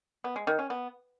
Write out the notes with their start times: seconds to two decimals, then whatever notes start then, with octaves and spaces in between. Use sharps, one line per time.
0.24 B3
0.36 G#3
0.47 D#3
0.59 C#4
0.70 B3